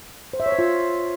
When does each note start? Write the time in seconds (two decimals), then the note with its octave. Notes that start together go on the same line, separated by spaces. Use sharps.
0.33 C5
0.40 E5
0.46 C#5
0.52 C5
0.59 F4